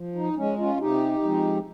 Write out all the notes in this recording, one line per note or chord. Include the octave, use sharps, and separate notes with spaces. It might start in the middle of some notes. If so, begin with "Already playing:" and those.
Already playing: F3
D#4
G#3 C#4
C#4 F4
C3 D#4 G4
F3 G#3 C4